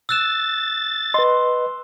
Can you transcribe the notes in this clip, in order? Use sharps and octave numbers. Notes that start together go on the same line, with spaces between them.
E6 F#6 A6 E7
B4 D#5 C6